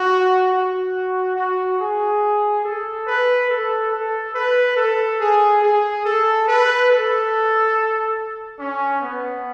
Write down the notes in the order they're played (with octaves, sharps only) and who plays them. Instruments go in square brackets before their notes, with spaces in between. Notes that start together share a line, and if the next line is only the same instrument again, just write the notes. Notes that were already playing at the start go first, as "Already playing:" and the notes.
Already playing: [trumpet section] F#4
F#4
F#4
G#4
A4
B4
A4
A4
B4
A4
G#4
G#4
A4
B4
A4
C#4
B3